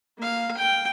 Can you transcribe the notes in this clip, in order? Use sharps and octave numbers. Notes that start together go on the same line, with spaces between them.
A#3 F5
G5